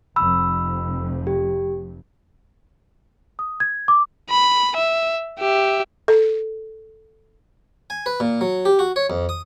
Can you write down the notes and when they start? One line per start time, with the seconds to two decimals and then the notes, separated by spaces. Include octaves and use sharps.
0.16 F1 F2 B5 E6
1.27 G4
3.39 D#6
3.60 G#6
3.88 D6
4.30 B5
4.77 E5
5.39 G4 E5
6.08 A4
7.90 G#5
8.06 B4
8.20 A#2
8.41 F#3
8.65 G4
8.79 F#4
8.96 C#5
9.10 F2
9.29 D#6